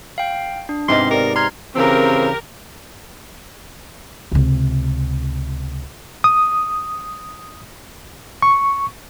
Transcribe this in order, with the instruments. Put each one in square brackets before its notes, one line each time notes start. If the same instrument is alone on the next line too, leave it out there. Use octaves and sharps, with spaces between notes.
[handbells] F5 G5
D4
[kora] G#2 C3 B3 [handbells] C4 D#5 [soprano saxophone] C6
[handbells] G4 D5 [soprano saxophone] A#4
[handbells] A#5 F6 G#6 [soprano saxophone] C6
[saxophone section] C#3 E3 C4 [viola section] G4 A#4
[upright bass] C#2 C3
[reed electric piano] D#6
C#6